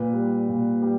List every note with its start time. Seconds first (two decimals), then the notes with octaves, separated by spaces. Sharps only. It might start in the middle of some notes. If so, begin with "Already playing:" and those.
Already playing: A#2 B4
0.13 G3
0.48 A#2
0.82 G3